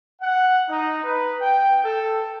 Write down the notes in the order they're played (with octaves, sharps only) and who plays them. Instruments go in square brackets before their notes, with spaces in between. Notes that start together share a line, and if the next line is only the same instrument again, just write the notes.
[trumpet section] F#5
D#4
B4
G5
A4